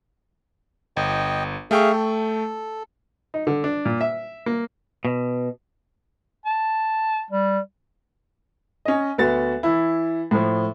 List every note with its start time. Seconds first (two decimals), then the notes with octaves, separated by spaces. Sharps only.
0.97 G1 D#5 G5
1.71 A3 G#4 E5 F5 G5 C#6
1.92 A4
3.34 D#4
3.47 D3
3.64 D4
3.85 A#2
4.01 E5
4.46 A#3
5.05 B2
6.46 A5
7.31 G3
8.85 C#4 D#5
9.18 D2 B3 F#4 A6
9.63 E3 E4
10.31 A2 F3